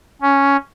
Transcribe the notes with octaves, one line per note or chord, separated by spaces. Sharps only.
C#4